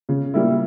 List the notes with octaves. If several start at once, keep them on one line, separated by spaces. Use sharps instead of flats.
C#3
G3 A#3 E4